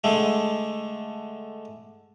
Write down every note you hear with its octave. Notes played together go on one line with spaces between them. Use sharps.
D3 G#3 A3